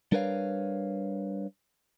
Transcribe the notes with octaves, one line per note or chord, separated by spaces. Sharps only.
G3 D4 A#4 B4 C#5 F5